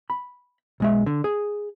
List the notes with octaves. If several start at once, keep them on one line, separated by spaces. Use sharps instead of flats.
B5
B1 G#3 E5
D3
G#4